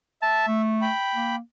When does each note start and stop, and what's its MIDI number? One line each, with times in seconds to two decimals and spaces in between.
0.22 0.62 76
0.22 0.45 81
0.47 0.89 57
0.82 1.36 79
0.82 1.36 83
1.15 1.39 58